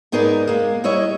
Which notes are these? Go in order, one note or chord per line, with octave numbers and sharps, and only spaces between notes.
G#2 B3 D#4 G#4 A#4 D5
G#3 A#3
G3 E4 C#5 D#5 E5